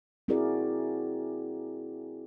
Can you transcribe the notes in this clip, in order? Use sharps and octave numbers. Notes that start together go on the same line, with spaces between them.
C4 E4 F#4 G#4 A#4 D5